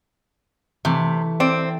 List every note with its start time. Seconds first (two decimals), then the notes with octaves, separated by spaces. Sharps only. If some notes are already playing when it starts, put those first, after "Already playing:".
0.85 C3 E3 A3
1.40 C4 D5